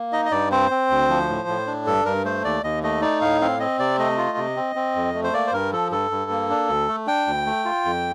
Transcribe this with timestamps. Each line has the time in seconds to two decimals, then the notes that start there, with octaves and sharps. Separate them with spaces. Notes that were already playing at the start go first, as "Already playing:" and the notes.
Already playing: A#3
0.13 D#4 D#5
0.25 D#5
0.32 G2 D5
0.51 C4 C5
0.71 C4
0.90 D2
1.09 F3
1.29 A2
1.48 A2
1.67 D4
1.86 G2 A4
2.05 G2 A#4
2.25 A3 C5
2.45 D#2 D5
2.64 D#2 D#5
2.83 A3 D#5
3.02 D#4 D5
3.21 A2 F5
3.41 C4 F5
3.60 C4 D#5
3.79 C3 D5
3.98 A3 D#5
4.18 F4
4.37 C3
4.56 C4
4.76 C4
4.95 F2
5.15 A3
5.24 C5
5.34 A#3 D5
5.47 C5
5.52 G2 A#4
5.73 F3 A4
5.91 G2 A4
6.11 G2
6.31 A#3
6.50 D4
6.69 D2
6.88 A3
7.07 D4 G5
7.27 D2
7.46 A3
7.65 F4
7.85 F2